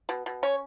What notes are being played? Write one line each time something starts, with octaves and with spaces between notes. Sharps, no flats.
B2
B2
C#4 C#5